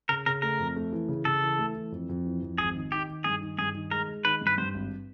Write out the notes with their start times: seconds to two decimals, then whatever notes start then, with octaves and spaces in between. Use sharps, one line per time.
0.09 C#3 A#4
0.26 C#3 A#4
0.42 A3 A#4
0.59 F2
0.76 A3
0.92 E3
1.08 C#3
1.25 C#3 A4
1.42 E3
1.59 A3
1.75 E3
1.92 F2
2.09 F2
2.25 E3
2.42 F2
2.58 G#1 G#4
2.75 D#3
2.92 D#3 G4
3.09 D#3
3.24 G2 G#4
3.42 D#3
3.58 G2 G#4
3.75 D#3
3.91 G#3 A#4
4.08 G#3
4.25 D#3 B4
4.41 G2
4.47 B4
4.58 G2 C5
4.74 G#1